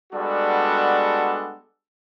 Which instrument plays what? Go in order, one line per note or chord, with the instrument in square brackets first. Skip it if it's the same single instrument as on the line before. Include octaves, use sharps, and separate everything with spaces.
[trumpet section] G3 G#3 B3 D4 F#4 A4